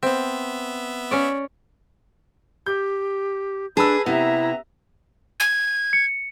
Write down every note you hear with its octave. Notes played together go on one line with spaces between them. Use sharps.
B3 C4 E5
C#4 C#5 D5
G4 G6
D4 G#4 B4 A5 B5 E6
C3 B3 E4 E5 A#5
G#6
C#7